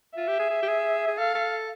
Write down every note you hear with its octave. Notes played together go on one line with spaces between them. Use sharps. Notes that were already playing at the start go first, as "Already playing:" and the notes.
F4 E5
G4
G#4
G#4
G4
G#4
G#4
A4 F5
A4